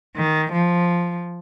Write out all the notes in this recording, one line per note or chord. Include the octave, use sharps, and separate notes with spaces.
D#3
F3